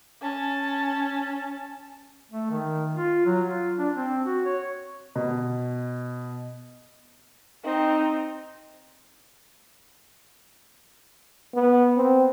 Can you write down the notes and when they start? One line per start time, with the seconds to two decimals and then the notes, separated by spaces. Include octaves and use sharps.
0.21 C#4 A5
2.31 A3
2.50 D#3
2.95 F4
3.26 F#3
3.47 F4
3.79 D4
3.95 C4
4.25 F#4
4.45 C#5
5.16 B2
7.64 C4 D#4
11.54 B3
11.96 C4